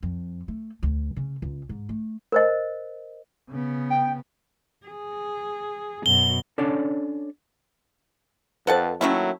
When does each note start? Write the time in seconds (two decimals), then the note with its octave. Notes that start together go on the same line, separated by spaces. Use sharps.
0.03 F2
0.48 A3
0.83 D2
1.16 C#3
1.42 C#2
1.69 G#2
1.89 A3
2.32 A#4 C5 D#5
3.50 C#3 B3
3.90 G5
4.86 G#4
6.06 F#2 B2 G7
6.58 C#4 D4 A4 C#5 D5
8.67 F2 A4 B4 C5 F#5 A5
9.01 D#3 F#3 A3 A#3 C#4 E4